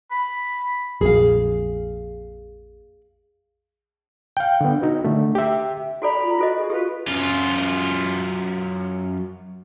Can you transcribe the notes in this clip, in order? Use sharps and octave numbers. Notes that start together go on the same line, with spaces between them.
B5
A#1 F2 A#2 G#4 F5
F5 G5
D3 B3
D#4 F#4
D3 A3
G4 E5
F#4 A4 D5 A#5 B5
F4
F4 F#4 A4 B4 D#5
G#4
F4 G4 A4 B4
F#2 F4